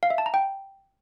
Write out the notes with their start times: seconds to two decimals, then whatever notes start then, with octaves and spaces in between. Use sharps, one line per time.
0.03 F5
0.10 E5
0.18 A5
0.26 A#5
0.34 G5